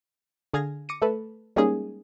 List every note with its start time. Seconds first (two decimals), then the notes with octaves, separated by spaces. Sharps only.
0.54 D3 G#4 F5 G#6 A#6
0.89 D6 A#6 C#7 D#7
1.02 A3 A4 B4
1.56 G3 G#3 A#3 C#4 D#4 G#4